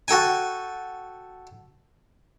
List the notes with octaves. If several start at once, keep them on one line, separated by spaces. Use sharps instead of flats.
F#4 A4 G5 G#5